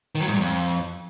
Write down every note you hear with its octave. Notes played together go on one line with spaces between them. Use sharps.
D#3
F#3
G#2
G2
F2